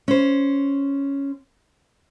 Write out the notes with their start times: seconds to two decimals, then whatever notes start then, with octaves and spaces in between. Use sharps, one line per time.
0.08 C#4 C5